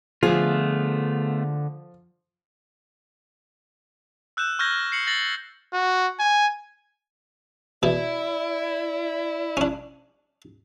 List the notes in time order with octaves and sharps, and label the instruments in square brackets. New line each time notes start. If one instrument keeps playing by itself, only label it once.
[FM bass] D3 [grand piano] F3 [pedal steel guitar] A3 B3 F4 [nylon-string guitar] G#4
[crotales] E6 F#6 G6 E7
C#6 F6 G6 G#6 A#6
A#6 C7 C#7 F#7
A6 A#6 F#7
[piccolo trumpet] F#4
G#5
[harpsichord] B2 E3 [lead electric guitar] E4 [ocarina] D5
[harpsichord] C#4 D4